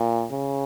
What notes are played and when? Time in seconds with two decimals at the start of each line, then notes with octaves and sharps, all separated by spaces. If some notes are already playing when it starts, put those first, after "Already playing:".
Already playing: A#2
0.31 C#3